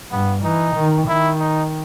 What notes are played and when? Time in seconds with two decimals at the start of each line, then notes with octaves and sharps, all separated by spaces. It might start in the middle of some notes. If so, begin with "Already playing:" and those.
0.11 G2 B3
0.43 E3 D#4
0.76 D#3
1.07 D#3 E4
1.40 D#4